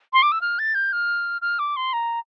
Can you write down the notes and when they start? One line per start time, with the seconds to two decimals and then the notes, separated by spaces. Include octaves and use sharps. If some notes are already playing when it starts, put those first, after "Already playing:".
0.13 C6
0.22 D6
0.32 E6
0.41 F6
0.59 A6
0.75 G6
0.93 F6
1.42 F6
1.59 D6
1.76 C6
1.93 A#5